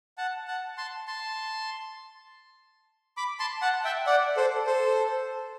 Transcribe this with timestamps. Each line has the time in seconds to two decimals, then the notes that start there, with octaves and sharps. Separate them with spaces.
0.18 F#5 A5
0.47 F#5 A5
0.77 A5 C6
1.07 A5 C6
3.17 B5 D6
3.39 A5 C6
3.62 F#5 A5
3.85 E5 G5
4.07 D5 F#5
4.37 A4 C5
4.67 A4 C5